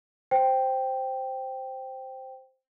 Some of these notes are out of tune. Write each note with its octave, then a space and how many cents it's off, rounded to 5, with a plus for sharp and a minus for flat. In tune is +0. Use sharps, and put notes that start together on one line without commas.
C5 +0 G5 +0